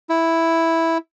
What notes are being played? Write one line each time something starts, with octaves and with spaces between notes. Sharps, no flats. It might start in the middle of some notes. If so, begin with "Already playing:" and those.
E4